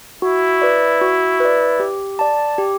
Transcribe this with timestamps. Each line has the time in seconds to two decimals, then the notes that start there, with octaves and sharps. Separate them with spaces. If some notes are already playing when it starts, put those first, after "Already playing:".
0.22 E4 F#4
0.62 B4 D5
1.01 F#4
1.40 B4 D5
1.80 G4
2.19 D5 A5
2.58 G4